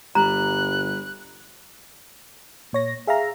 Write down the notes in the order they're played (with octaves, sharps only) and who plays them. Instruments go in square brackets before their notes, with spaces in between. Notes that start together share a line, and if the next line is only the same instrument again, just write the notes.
[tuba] G1 [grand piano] G3 [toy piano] A#5 [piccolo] F#6
[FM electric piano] A#2 C#5 A#6
G#4 E5 F5 A#5